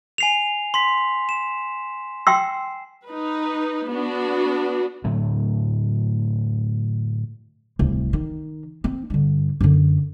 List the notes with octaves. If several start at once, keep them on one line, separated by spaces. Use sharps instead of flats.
G#5 C7 F7
C6 B6
E7
G5 C6 E6 C7
D#4 B4
B3 D4 F#4
A2 D3 F#3 A3
D1 C2
D#3
C4
G2 D3
F#2 D3